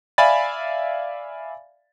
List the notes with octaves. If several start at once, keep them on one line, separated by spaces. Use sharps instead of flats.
D5 E5 F5 G#5 B5 A6